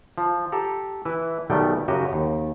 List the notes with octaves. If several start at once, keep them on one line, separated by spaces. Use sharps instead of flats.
F3
G4 A4 A#5
E3 E4 B4
B1 D#3 G3 A3 B3 G5
F#2 C#3 F#4 G4 D#5
D#2